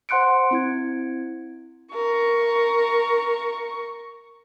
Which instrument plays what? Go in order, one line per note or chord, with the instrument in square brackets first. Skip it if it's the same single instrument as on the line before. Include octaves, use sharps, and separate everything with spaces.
[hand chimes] C5 F#5 C6 F#6 C#7 D7
C4 E4 G#6
[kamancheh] A#4 C#6